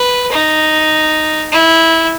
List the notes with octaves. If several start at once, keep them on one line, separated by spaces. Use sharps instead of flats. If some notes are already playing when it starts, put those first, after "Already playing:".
Already playing: B4
D#4
E4